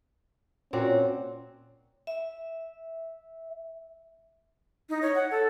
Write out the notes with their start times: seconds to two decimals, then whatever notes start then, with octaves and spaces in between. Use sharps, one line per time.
0.73 A#2 C4 C#4 F#4
2.07 E5
4.89 D#4
5.02 C#5
5.15 F#5
5.31 A4